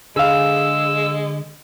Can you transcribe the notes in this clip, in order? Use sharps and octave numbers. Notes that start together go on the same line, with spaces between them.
D3 G#3 G#4 F5 E6